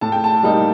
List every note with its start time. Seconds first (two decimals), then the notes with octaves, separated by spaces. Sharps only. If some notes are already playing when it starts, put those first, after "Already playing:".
0.01 A2 A5
0.12 G5
0.24 A5
0.43 G3 A#3 D#4